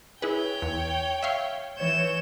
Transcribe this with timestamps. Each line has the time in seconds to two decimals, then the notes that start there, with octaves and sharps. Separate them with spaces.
0.22 E4 G#4 B4 C#5 G5
0.62 E2
1.23 E5 F5 C#6
1.76 E3 C#5 G6 E7